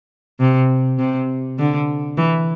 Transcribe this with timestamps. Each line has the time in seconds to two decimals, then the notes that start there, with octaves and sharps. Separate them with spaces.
0.40 C3
0.99 C3
1.59 D3
2.17 E3